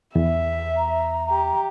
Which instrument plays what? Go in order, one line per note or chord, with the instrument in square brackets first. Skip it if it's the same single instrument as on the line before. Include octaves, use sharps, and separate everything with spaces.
[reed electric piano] E2 [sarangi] E5
[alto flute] A#5
[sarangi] G4